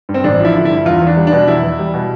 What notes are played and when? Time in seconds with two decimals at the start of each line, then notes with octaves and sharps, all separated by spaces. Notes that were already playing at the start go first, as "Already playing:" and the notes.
0.09 G2
0.14 C4
0.24 A1 D4
0.40 F3 E4
0.55 D3
0.65 G2 E4
0.85 E2 F4
1.01 E2
1.07 D4
1.17 G3
1.27 D4
1.32 B2
1.48 E2 E4
1.63 E2
1.79 G3
1.94 B2